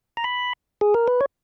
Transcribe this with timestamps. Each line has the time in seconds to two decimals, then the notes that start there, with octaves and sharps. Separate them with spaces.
0.17 A#5
0.24 B5
0.81 G#4
0.94 A#4
1.08 B4
1.21 C#5